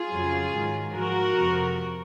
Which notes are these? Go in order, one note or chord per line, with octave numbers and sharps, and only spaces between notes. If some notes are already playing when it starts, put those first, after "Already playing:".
Already playing: F4 G#4
F2 C#3 F#3
G#2 D#3 F#3
G#2 F3 F#4 A#4
F2 C3 F3